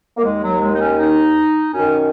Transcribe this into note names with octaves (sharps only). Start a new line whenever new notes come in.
A#3
D#2 D#3 G#3
F#3
G#3
D#4
C#4
D#4
F#2 D#3 C#4